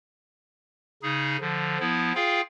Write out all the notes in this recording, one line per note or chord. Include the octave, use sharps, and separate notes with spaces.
C#3 D#4 G#4
D3 F3
F3 B3 E4
F4 G#4 F5 G5